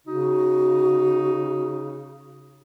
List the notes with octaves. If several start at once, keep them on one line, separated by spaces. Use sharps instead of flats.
C#3 D#4 F#4